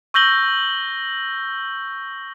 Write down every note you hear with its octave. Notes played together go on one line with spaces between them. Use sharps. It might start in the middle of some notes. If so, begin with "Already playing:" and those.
C#6 E6 G6 A#6 F#7 G7